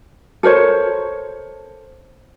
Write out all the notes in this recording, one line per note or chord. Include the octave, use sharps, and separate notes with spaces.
A4 A#4 C5 C#5